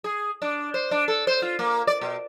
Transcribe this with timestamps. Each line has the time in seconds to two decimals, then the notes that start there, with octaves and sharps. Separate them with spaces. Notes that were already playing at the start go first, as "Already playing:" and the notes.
0.04 G#4
0.42 D4
0.74 C5
0.91 D4
1.08 A4
1.27 C5
1.42 F4
1.59 A#3
1.87 D5
2.01 B2